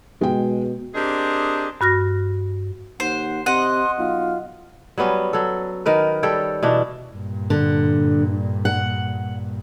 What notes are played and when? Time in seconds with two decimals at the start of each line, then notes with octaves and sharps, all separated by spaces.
0.21 B2 G#3 G5
0.95 C4 D4 G4 G#4 A#4 D#5
1.81 G2 F#4 F6 A#6
3.00 D#2 C5 F#5
3.46 C3 D#5 F#5 C6
3.98 B1 F4
4.98 F#3 G3 B3 C#4
5.33 F#3 A4
5.86 D#3 A#4 B4
6.23 G3 A4 C#5 G5
6.63 B2 E3 D4
7.11 G2 A#2
7.50 D3
8.65 F#5